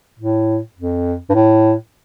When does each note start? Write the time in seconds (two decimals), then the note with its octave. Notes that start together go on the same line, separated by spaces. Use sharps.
0.19 A2
0.76 F2
1.29 G2
1.34 A2